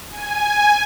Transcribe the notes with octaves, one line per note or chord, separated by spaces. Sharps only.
G#5